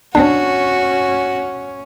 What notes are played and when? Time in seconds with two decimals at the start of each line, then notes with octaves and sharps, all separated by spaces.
0.15 C#4 D4 F#4